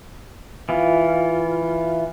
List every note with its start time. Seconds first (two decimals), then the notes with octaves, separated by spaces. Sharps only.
0.69 E3 F4